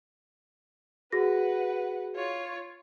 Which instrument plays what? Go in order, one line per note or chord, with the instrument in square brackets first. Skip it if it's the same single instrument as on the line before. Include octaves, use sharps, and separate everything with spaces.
[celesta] F#4 G#4 A#6 [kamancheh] B4 F#5
[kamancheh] F4 C#5